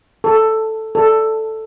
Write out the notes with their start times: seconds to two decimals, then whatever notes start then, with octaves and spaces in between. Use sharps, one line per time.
0.24 A4
0.95 A4